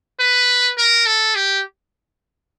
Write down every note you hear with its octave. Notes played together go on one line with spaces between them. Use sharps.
B4
A#4
A4
G4